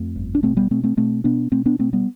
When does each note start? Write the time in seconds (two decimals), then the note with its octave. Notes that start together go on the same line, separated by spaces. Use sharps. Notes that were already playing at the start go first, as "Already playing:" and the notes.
Already playing: F2 A3
0.16 G1
0.35 D4
0.42 B2 A3 C4
0.57 G3 B3
0.71 B2 A3 C4
0.84 A3 C4
0.97 B2 A3 C4
1.24 B2 B3 D4
1.52 B2 A3 C4
1.66 B3 D4
1.79 B2 A3 C4
1.93 G3 B3